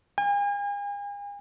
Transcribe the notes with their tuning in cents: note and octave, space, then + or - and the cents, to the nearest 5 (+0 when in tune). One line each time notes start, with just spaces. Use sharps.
G#5 -40